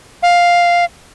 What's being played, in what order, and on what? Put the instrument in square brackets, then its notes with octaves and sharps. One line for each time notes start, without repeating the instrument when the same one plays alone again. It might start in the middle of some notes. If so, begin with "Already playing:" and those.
[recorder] F5